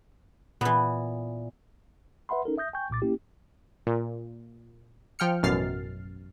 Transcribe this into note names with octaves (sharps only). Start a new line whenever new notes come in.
A#2 E3 B3
B4 E5 F#5 B5 C6
C#4 D#4 A4 A#4
E5 D#6 G6 A#6
G5 G#5 C#6 G6
C2 A#2 D6 A6
A#3 C#4 E4 G4
A#2
F3 G5 F6 C#7
A1 F#2 B2 F6 A6 C7